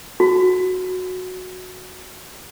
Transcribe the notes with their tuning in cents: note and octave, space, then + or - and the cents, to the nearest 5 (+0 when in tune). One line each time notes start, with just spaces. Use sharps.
F#4 -10